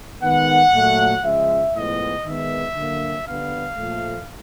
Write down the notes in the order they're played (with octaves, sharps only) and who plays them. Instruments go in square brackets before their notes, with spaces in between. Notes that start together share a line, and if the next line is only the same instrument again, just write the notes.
[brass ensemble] D#3 G#3 B3 F#5
A#2 F#3 A3
C#3 F3 G#3 E5
A2 F3 G#3 B3 D#5
D#3 G#3 B3 E5
D3 F#3 A#3
D3 G3 B3 F5
A#2 F3 A3